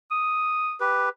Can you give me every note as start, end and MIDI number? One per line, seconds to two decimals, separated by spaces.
0.11 0.75 87
0.80 1.09 67
0.80 1.09 71